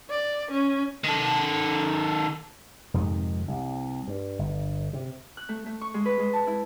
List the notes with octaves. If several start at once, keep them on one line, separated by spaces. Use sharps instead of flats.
D5
C#4
D#3 A4
F2 G#2 C3 D#3
C2
G2
G1
C3
F#6
A3
A3
C#6
G#3
B4
G#3
A5
E4